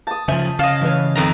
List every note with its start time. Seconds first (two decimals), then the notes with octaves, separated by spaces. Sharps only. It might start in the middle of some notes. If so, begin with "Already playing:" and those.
0.07 A5 D#6
0.28 C#3 F3 C5 E5 G#5
0.59 C#3 D#5 F5 A5
0.81 E3 B4 C#5
1.15 F2 D#3 A#5